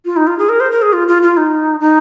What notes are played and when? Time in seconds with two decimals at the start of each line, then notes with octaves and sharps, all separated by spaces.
0.05 F4
0.17 D#4
0.27 F4
0.38 G#4
0.49 A#4
0.60 C5
0.71 A#4
0.82 G#4
0.93 F4
1.08 F4
1.23 F4
1.37 D#4
1.81 D#4